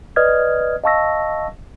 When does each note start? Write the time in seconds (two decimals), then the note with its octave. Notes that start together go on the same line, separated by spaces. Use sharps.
0.16 B4 D5 D#5 D#6 F6 G#6
0.84 D#5 F5 A5 C#6 E6 A#6